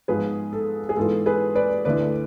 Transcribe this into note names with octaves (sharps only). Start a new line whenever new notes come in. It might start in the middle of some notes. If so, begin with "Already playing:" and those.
G#2 F3 B3 G#4 B4
A4
G#4
G#2 E3 B3 F4 A4
G#4 B4
B4 D5
D2 D3 A3 E4 B4 D5